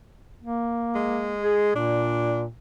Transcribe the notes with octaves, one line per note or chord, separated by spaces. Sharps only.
A#3
G#3
G#4
A#2 D4